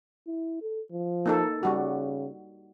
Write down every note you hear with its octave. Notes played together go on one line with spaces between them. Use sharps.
E4
A4
F3
A#3 D#4 A4
C#3 G3 F#4